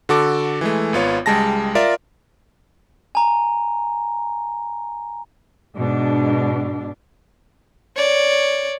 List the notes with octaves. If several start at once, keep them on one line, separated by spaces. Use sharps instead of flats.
D3 F#4 A4 D6
E3 G#3 A3
G#1 B3 F4 C#5
C#2 G3 G#3 A5 A#6
F4 A#4 D5 E5
G#5 A#5
G#2 B2 D4
C#5 D5